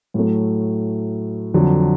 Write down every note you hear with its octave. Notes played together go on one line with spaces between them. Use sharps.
A2 F#3 A3
F2 D3 F#3